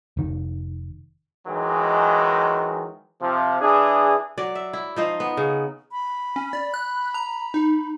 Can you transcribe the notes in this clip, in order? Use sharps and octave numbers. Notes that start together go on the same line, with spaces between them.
F1 D#3
D#3 E3 F#3 G#3
C3 F3
E3 D4 G#4
F#3 D5
E5
E4
F3 D#4 C5
B3
C#3
B5
C#4
D5
F#6
A#5
D#4